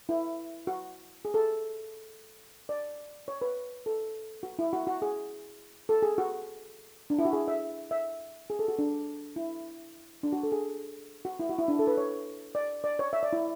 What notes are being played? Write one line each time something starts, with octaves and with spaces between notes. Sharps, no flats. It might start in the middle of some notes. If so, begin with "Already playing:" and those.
E4
F#4
G#4
A4
D5
C#5
B4
A4
F#4
E4
F#4
F#4
G#4
A4
G#4
F#4
D4
E4
F#4
G#4
E5
E5
G#4
A4
F#4
D4
E4
D4
F#4
A4
G#4
F#4
E4
F#4
E4
D4
A4
B4
C#5
D5
D5
C#5
E5
D5
E4